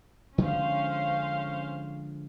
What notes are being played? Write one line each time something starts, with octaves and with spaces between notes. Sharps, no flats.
D3 F3 G#3 C#4 C5 F5